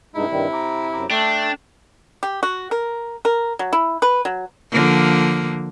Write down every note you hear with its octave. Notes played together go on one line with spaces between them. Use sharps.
G2 C3 G#3 D#4 E4
G2 D#3 G3
A#5 D6
F#2 A#5 D6
A3 D4 G5
G4
F#4
A#4
A#4
F#3
E4
B4
F#3
D3 F3 A#3